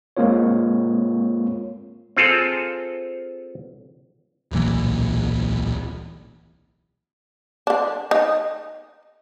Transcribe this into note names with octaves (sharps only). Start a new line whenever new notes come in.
G#3 A#3 C4 F4 C#5
C4 F4 G#4 A4
D1 B1 A#2 E3
D3 D4
D#4